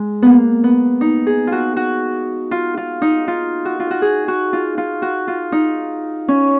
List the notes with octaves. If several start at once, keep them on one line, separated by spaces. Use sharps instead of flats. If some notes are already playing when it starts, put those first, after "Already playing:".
Already playing: G#3
A#3 B3
B3
D#4
G#4
F4
F#4
F#4
F4
F4
D#4
F4
F#4
F4
F#4
G#4
F#4
F4
F4
F#4
F4
D#4
C#4